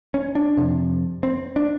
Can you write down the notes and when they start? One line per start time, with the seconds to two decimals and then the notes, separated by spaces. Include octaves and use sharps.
0.14 C#4
0.35 D4
0.57 F2 C3
1.23 C4
1.56 D4